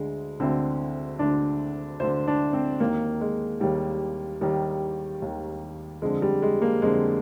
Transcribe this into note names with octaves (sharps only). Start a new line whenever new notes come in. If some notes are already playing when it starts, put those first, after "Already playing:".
Already playing: D2 D3 G#3
D2 D3 C4
D2 D3 D4
D2 D3 C5
D4
C4
D#2 D#3 A#3
G#3
D#2 D#3 G3
D#2 D#3 G3
D#2 D#3
F2 D3 G#3
G3
G#3
A#3
F2 D3 G#3